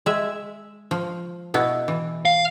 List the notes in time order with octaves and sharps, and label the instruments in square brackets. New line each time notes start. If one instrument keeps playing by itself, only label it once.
[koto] G#3 E5
F3
B2 B3 E4
E3
[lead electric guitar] F5